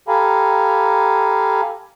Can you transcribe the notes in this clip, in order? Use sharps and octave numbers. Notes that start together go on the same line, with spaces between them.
G4 A4 F5 G#5 A#5 B5